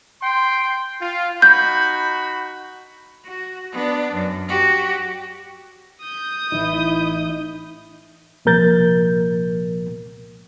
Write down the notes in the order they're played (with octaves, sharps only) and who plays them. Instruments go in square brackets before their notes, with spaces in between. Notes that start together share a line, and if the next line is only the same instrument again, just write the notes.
[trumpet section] G5 C6
F4
[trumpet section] D#4 F#4 B5 [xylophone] G6
[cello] F#4
B3 D4
F#2
F#4 G4
[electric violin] D#6 G6
[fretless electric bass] A1 E3 [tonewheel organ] D#4 [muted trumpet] E4
[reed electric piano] C2 A#2 F3 A#4 G6 A6